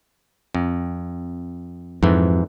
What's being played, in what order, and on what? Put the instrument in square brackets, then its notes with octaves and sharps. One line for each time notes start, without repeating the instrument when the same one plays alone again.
[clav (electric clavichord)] F2
[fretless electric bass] F2 [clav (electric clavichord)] G#2 E3